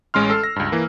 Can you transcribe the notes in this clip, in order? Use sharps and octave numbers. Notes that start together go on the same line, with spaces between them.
A1 G#3 C#4 C6 F6
A4 E6 C7
A#6
C#2 G2
E3 A#3